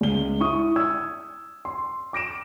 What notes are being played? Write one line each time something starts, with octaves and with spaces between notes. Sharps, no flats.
C#2 G7
E4 C#6 D#6
E6 G#6
C6
D6 A#6 D7 E7